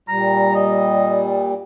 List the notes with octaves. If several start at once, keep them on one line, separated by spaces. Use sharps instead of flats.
A#2 G3 A#5
D#5